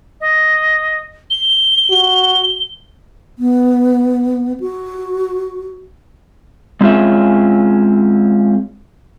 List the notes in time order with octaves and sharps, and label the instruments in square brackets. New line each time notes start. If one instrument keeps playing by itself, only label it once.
[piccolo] D#5
G7
[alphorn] F#4
[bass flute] B3
F#4
[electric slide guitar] G#3 C4 C#4 F4 G#4 E5